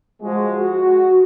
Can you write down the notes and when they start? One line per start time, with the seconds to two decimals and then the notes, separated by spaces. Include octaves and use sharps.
0.21 F3 G#3 F#4
0.59 F#4